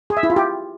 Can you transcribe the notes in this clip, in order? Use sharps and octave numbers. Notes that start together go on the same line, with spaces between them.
G#4
E5
E4
F4
G4